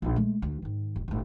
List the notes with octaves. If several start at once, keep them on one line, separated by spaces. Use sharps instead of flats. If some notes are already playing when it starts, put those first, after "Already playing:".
A#1 D#4
G#3 A3
D2
G#2 D#3
D#1
G1 A2